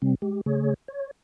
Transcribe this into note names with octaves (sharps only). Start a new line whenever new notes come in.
C3 G3 C4
G#3 G4
C#3 A3 G#4 C#5
C#5